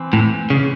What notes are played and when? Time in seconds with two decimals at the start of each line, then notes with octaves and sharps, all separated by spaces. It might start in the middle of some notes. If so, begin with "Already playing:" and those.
Already playing: E3 C4
0.13 A2
0.50 C#3